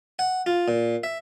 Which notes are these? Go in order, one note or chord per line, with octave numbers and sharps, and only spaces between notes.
F#5
F4
A#2
E5